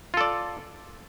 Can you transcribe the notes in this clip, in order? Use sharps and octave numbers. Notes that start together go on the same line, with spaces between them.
F4 A4 D5